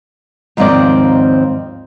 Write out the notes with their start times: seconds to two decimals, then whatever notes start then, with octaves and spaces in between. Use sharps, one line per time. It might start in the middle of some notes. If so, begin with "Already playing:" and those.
0.57 D#2 G#2 F3 C4 A#4 D5